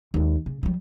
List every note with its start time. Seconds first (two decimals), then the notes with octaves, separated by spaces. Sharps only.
0.14 D#2 G#3
0.46 C#3
0.63 F3 G3